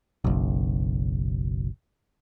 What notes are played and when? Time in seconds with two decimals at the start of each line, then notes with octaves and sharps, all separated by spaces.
0.24 F#1 B1